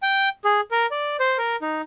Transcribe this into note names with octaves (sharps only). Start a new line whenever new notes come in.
G5
G#4
A#4
D5
C5
A#4
D#4